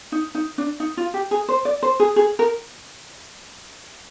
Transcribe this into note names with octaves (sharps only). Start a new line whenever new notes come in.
D#4
D#4
D4
D#4
F4
G4
G#4
C5
D5
C5
G#4
G#4
A#4